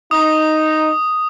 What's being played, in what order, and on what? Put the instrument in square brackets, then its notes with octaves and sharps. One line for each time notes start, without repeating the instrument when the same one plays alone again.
[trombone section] D#4 [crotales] D#6